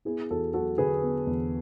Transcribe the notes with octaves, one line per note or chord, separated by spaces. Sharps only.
B3 E4 G#4
E2 F#4 A4
F#3 F#4 A4
D3 G#4 B4
B3
E2